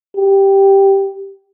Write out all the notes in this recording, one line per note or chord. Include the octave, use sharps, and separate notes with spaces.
G4